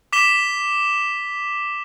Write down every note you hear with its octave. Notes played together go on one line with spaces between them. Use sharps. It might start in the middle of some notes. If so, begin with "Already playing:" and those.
D6 B6 E7 G7